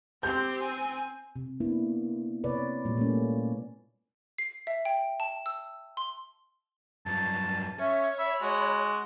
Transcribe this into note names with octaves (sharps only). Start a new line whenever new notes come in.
C4 G4 G6
G#5
C3
A#3 B3 D4 E4
C3 B4 C#5 D5
A#2 G3 G#3
A3 A#3 C#4
C7
E5
G5
A5
E6
C6
G2 F#3 A5
C#4 C#5 E5
E5 B5
G#3 F#4